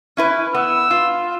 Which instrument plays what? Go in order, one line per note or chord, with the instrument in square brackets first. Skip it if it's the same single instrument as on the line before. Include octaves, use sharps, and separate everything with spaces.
[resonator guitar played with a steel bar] C#4 E4 B4
[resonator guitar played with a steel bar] B3 [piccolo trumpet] E6
[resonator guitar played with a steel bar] F4